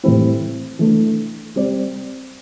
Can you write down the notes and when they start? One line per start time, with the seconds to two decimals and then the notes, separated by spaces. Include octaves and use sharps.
0.04 A2 E3 G3 C4 E4
0.79 E3 A3 D4
1.56 G3 C4 G4 D5